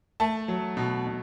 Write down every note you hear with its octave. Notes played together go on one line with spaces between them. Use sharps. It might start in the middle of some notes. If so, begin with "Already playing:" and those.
A3 A5
F#3
B2
B2